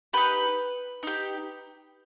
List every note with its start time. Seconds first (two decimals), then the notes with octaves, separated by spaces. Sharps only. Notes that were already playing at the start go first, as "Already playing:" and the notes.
0.13 D#4 G4 B4
1.03 D#4 G4